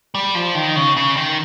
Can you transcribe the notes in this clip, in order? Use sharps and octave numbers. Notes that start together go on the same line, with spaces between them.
G3
F3
D#3
C#3
C#3
D#3